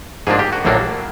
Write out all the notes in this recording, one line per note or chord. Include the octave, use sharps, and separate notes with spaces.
G#2 F3 A#3 D4 G#4
G4
F#4
A#1 A2 F#3 A#3 D4